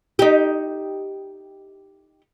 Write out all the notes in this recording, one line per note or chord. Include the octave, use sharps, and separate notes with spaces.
D#4 G4